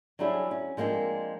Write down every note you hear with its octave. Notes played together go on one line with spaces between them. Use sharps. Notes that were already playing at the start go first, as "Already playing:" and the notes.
F#3 G3 D4 E4 G#4
C#4
F3 G#3 A#3 C4 D4